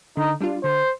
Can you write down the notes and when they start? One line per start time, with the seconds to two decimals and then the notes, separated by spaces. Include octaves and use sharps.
0.17 D3 D#4
0.41 G3 D4 F4
0.64 D3 C5